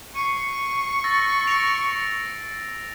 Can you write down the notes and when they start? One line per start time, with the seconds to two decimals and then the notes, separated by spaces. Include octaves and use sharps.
0.15 C#6 C7 C#7 D#7
1.04 E6 A6 A#6
1.47 A#6 D7 F7